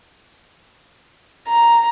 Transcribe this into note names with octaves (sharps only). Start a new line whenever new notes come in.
A#5